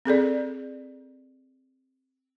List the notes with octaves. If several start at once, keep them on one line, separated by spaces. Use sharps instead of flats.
C4 G#4 A4 D5